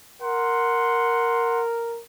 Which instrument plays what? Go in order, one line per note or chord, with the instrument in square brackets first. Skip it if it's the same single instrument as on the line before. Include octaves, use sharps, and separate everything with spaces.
[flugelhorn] A#4 [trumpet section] F#5 C6